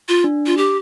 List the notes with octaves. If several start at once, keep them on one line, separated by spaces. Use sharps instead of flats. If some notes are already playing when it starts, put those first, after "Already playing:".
F4
D4
F4
G4